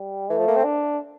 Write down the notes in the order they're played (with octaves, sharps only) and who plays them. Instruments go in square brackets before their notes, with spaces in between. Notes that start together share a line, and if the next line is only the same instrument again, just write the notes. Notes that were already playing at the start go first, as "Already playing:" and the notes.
Already playing: [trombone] G3
[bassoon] E3 [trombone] A3
[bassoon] F3
A#3
C4
[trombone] D4